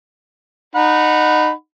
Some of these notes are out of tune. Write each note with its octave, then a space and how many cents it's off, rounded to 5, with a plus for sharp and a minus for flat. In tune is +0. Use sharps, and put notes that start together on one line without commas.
D#4 -20 F#5 -15 B5 +0